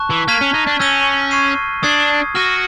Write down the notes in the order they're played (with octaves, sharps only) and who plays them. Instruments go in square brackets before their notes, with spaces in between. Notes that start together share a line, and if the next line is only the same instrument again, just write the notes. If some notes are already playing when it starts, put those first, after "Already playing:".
Already playing: [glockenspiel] A5 C#6 F#6
[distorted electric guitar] E3
[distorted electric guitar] A#3 [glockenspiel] F6 G#6 B6 D#7
[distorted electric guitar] C#4
D#4
D4
[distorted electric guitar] C#4 [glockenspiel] E6 G6 A#6 D#7 G7
[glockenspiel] C#6 F6 G#6 C7 D#7
[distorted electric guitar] D4 [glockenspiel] D#6 G#6 C7
[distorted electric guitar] F#4 [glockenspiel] C#6 F6 A#6 D#7 G7